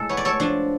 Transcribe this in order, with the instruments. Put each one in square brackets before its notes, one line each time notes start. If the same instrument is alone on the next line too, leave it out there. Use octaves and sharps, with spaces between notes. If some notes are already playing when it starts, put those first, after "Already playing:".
Already playing: [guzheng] A2 G#3 A4
B3 C#5
D5
A4 C#5
F3 D4